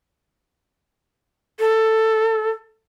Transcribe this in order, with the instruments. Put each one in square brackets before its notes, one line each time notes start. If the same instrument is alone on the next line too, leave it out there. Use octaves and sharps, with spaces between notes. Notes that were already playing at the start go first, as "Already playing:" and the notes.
[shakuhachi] A4